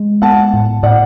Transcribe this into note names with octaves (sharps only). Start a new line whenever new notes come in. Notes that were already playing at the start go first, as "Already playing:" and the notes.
Already playing: G#3
B3 F#5 A5
A2
A2 D5 F#5